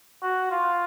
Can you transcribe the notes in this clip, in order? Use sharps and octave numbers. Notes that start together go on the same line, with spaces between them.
F#4
F4